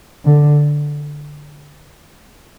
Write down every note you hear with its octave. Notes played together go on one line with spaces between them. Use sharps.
D3